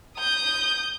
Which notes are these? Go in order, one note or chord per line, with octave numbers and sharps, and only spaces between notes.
D#6 G6